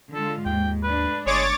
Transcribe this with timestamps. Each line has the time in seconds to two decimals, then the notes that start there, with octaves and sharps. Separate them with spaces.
0.14 D3 G#3 F4 A4
0.46 D#2 G#2 G5
0.83 A3 D4 B4
1.26 G1 G#3 C#5 D6 A6